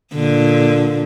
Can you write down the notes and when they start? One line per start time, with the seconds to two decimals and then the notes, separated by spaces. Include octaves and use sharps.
0.15 A#2 D3